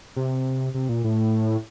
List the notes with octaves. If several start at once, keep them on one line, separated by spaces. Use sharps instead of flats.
C3
C3
A#2
A2